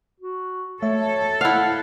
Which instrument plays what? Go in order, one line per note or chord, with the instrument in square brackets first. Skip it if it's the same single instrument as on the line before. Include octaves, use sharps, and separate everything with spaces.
[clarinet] F#4
[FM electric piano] A3 E5 [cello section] A4 [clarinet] C#5
[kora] E4 F5 [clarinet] F#5